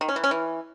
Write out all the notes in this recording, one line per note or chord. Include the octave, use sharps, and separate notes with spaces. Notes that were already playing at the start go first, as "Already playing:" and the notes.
D#3
C#4
E3
C#4
E3